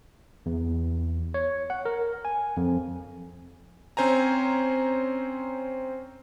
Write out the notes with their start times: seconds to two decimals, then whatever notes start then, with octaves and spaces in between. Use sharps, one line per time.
0.46 E2
1.34 C#5
1.70 F#5
1.85 A#4
2.25 G#5
2.57 F2
3.97 C4 C#4 C5 G#5 A#5